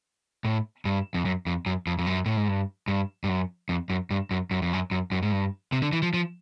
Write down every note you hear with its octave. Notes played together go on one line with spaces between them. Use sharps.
A2
G2
F2
F#2
F2
F#2
F2
F2
F#2
A2
G#2
G2
G2
G2
F#2
F2
F#2
G2
F#2
F#2
F2
F#2
F#2
F#2
G#2
G2
C3
D3
E3
F3
F3